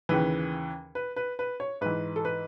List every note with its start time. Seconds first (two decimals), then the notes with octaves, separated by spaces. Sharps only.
0.09 D#2 C#3 E3 B4
0.95 B4
1.16 B4
1.39 B4
1.60 C#5
1.81 G#2 E3 B4
2.16 A4
2.25 B4